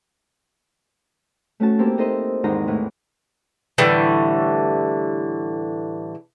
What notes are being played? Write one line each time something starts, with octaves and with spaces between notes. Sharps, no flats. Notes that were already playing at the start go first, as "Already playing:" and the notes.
A3 C#4 F#4 A5
A#3 C4 E4 G4 A#4
D#4 A4 A#4 C5 D#5 E5
E2 G#2 D#3 D#4 A#5
A2 E3
A2 D3 E3 G3